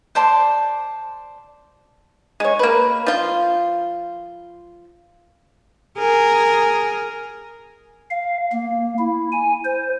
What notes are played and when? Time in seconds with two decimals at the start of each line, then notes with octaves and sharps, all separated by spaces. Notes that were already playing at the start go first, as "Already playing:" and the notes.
0.15 C5 D5 A5 C6
2.40 G#3 C#5
2.59 A#3 B4
3.06 F3 F4
5.98 G#4 A#4
8.10 F5
8.52 A#3
8.98 E4
9.32 G#5
9.65 C5